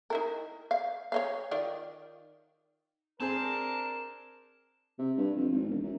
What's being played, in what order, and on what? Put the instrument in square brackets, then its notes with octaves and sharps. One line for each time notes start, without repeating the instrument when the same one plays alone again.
[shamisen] D#4 E4 A#4
F5
C#5 D#5 F5
D#3 F4 D5
[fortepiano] C4 G#4 C5 [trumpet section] D4 A#4 [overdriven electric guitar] A5
[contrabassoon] C3
G2
F2
G#1
E1
F#2